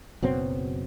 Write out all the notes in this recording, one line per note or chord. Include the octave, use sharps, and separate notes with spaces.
F#1 B2 F#3 C4